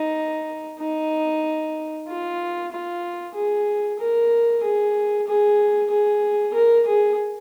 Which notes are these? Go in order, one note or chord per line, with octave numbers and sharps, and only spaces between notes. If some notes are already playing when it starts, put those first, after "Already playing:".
Already playing: D#4
D#4
F4
F4
G#4
A#4
G#4
G#4
G#4
A#4
G#4